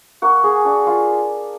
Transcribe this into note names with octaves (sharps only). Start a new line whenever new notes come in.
A#3 F#4
G#4
D4 F#4
F4